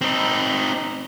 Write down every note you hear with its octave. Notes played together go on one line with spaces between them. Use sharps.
C4 D#4